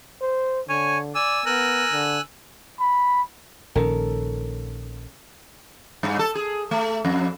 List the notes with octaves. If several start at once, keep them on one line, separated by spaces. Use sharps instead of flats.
C5
D3 C#5 G#5
D5 G#5 E6
B3 A#4 G#5 E6 F#6
D3
B5
A#1 D#3 C#4 A4 A#4
G2
A4
G#4
A3
F2